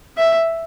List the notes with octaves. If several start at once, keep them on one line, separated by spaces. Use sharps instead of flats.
E5